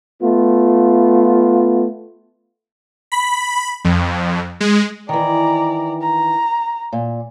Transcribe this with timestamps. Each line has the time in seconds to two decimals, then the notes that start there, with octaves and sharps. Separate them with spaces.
0.23 A3 B3 F4
3.12 B5
3.85 F2
4.60 G#3
5.09 D#3 E3 D5 A#5
6.02 A#5
6.93 A#2